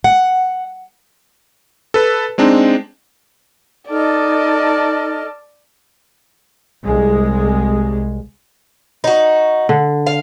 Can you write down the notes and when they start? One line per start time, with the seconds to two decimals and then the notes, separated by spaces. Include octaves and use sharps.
0.04 F#5
1.94 A4 B4
2.38 G#3 C4 D4 D#4
3.90 D#4 A4 D5 D#5 A5 F6
6.85 C2 G#3
9.04 D#4 F#4
9.69 D3
10.06 F5